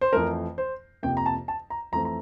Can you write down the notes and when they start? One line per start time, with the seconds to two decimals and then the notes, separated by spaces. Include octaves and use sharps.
0.01 C5
0.13 F2 E3 A3 A#4
0.58 C5
1.03 F2 C3 F3 A#3 G5
1.17 A#5
1.26 A5
1.48 A5
1.70 A#5
1.92 F2 E3 A3 C4 A#5
2.05 A#5